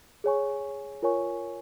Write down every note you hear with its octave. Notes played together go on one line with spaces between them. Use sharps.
G#4 C#5 G#5 C#6
F4 A#4 C#5 G#5 C#6